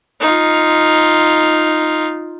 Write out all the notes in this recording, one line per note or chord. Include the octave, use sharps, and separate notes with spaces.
D#4 F4